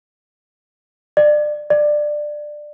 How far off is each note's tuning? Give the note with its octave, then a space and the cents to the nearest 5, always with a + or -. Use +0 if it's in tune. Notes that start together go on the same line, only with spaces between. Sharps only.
D5 +25
D5 +15